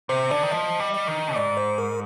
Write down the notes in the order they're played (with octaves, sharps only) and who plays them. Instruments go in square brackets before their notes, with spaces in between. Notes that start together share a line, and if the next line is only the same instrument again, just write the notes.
[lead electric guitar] C3 [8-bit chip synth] C5
[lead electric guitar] D3 [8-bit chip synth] D5
[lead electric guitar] D#3
[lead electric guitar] F3 [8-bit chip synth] D#5
[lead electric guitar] G3
[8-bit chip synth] D#5
[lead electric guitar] D#3
[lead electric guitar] G#2 [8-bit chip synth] D5
[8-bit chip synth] C5
A#4